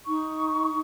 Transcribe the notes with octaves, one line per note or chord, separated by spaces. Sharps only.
D#4 C#6